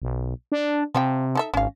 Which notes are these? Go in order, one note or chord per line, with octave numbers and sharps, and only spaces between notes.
B1
D4
C3 F3 G3 G5
D#4 A4 E5
G#1 C#4 F5